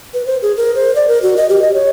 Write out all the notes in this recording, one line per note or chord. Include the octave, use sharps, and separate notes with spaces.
B4
C5
G#4
A#4
C5
D5
A#4
F#4
D#5
G4
D#5
C#5